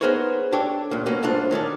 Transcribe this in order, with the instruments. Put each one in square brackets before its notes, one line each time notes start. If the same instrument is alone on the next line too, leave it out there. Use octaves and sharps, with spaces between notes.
[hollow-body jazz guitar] B3 D#4 G#4 A#4 C5 C#5
D4 G4 A4 C#5
C#2 A#2
B2 F#3 A#3 C#4
C2 G#2 A3 D4 F4
D#3 C#4 A4 D5